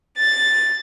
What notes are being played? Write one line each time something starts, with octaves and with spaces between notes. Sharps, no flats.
A6